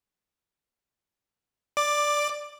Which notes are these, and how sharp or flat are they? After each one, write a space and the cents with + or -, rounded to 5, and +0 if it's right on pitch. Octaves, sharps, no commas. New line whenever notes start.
D5 +0 D6 +15